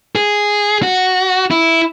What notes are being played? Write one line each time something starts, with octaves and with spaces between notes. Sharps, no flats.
G#4
F#4
E4